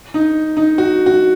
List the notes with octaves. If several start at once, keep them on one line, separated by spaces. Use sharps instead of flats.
D#4
D#4
F#4
F#4